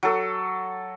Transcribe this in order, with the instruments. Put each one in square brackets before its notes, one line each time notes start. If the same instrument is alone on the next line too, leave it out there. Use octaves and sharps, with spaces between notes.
[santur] F#3 A4